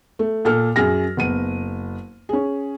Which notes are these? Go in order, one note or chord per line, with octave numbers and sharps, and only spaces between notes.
A3
A#2 A4 F6
F#2 G#4 F6 A#6
F#1 B3 D#7
C#4 G#4